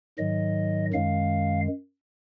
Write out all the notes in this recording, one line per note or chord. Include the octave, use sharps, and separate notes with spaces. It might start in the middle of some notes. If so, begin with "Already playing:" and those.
G#2 D#3 F#3 D#5
F#2 D#3 G#3 F5